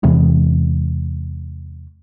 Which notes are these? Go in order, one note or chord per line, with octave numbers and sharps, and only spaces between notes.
E2 C3 E3 G#3